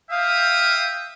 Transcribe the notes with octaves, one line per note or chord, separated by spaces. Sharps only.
E5 F5 G5 D#6